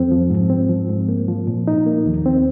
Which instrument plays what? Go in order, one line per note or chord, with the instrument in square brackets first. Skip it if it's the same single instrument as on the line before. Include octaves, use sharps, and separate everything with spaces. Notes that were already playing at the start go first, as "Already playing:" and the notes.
Already playing: [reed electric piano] F2 C4
F3
G#2
C4
F3
G#2
A#3
F3
A#2
D#4
A#3
D#2
C4